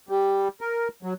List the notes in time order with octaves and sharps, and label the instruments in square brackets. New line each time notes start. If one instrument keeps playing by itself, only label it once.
[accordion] G3
A#4
F#3